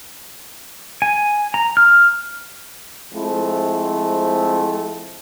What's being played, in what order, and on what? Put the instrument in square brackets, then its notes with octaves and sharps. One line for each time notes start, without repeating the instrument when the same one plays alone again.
[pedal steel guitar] G#5
A#5
F6
[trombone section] F3 G#3 A3 C4 E4